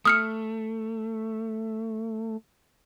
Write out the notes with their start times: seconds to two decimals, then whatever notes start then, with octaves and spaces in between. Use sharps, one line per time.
0.05 A3 D#6 F6 C#7